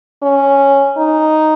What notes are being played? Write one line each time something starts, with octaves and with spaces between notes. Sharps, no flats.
C#4
D#4